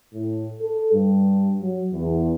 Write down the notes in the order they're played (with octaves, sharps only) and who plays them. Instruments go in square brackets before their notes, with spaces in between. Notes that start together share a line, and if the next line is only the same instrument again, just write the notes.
[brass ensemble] A2
A4
G2
F#3
E2